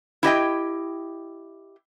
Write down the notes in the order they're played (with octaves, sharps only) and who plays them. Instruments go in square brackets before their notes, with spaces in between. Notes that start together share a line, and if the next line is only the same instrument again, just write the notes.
[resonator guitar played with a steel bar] E4 G4 D#5 G5